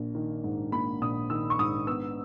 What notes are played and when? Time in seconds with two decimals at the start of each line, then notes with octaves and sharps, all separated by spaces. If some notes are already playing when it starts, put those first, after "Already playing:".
Already playing: A#1 A#3
0.15 D#3
0.44 G#2
0.72 A#3 B5
1.01 A#1 D#6
1.30 D#3 E6
1.50 C#6
1.59 G#2 D#6
1.87 B3 E6